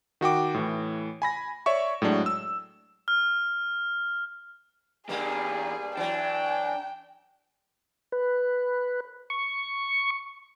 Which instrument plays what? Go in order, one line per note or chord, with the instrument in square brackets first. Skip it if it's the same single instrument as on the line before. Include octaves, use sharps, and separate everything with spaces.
[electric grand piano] D#3 F#4 G5 D6
A2 E3
G#5 B5 A#6
C#5 D5 E5 C#6
A2 F#3 G#3 D4
E6
[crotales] F6
[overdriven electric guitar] E2 G4 [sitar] G2 G3 A#3 [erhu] G#4
[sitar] E3 F#3 [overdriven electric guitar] D4 [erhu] G5
[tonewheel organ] B4
C#6